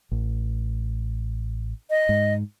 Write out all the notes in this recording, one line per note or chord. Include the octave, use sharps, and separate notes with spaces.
A1
D#5
G#2